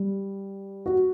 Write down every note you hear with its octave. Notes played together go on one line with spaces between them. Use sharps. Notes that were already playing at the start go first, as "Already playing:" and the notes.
Already playing: G3
F#4